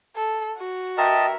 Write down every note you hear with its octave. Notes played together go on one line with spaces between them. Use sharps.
A4
F#4
G2 A#4 D#5 E5 G5 A5